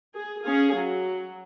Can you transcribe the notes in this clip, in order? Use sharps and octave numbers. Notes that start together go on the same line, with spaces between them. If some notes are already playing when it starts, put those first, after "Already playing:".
G#4
C#4 G#4 F5
F#3